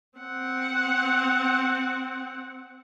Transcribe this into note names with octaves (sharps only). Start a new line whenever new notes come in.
C4 F#5